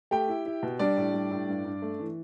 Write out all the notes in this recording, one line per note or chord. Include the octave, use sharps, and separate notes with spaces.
A3 G4 G5
E4
E4
B2
G3 D4 D5
A2
G3
A2
G2
G2
A3
E3